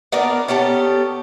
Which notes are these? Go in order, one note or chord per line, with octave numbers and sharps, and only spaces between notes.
B3 D4 A#4 D5
B3 C#4 G4 A4